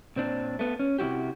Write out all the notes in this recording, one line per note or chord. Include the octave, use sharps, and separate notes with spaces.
A#2 C4 D4
A3 B3
C#4
C3 D#3 E4 F#4 G4